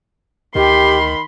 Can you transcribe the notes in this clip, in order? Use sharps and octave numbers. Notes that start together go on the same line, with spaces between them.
D2 D#3 G4 B5 C6